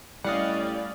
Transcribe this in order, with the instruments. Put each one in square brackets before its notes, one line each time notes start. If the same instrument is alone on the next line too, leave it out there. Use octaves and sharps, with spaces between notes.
[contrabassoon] A2 [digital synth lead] G3 [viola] C#4 D5 [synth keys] D#5 F5 F#5